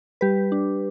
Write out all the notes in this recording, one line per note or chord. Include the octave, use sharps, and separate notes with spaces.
G3 G4 B4
D4